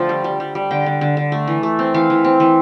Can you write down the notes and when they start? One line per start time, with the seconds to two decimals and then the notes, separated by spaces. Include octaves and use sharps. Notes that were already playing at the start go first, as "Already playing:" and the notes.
Already playing: D3 F3 A3 G5 A5
0.09 G3
0.24 G3
0.40 G3
0.55 G3
0.71 D3 G5
0.86 D3
1.01 D3
1.17 D3
1.32 A3
1.47 E3
1.63 A3
1.79 C4
1.94 E3 F5
2.10 E3
2.24 C4
2.40 E3